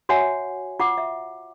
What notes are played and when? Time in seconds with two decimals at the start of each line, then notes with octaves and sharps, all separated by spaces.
0.09 F#4 C#5 E5 F#5 G#5
0.80 F4 F#5 D6
0.98 E5